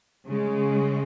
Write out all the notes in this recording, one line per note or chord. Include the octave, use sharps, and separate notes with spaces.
C#3 G#3